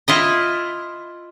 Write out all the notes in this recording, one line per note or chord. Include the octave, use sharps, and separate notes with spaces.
E4 F4 D#5